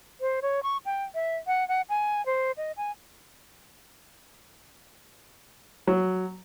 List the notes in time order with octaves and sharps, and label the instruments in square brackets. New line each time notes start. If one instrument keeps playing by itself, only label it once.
[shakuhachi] C5
C#5
C#6
G5
E5
F#5
F#5
G#5
C5
D#5
G#5
[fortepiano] F#3